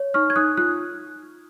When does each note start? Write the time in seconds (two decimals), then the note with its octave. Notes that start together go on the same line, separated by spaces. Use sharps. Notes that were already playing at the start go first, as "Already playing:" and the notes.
Already playing: C#5
0.14 D#4 C#6 F6
0.30 G#6
0.36 D#4 D#6 F#6
0.57 F4 F#6